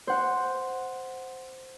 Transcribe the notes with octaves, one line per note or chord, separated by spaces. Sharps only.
C5 F#5